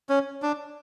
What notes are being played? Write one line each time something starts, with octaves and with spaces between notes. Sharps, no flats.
C#4
D4